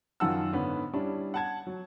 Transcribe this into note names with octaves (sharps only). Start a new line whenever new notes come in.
F#2 D#3 F4 F#5 A5 E6
G#2 D3 B3 C#4
G3 C#4 D4 E4
F#5 A5 G#6
F#3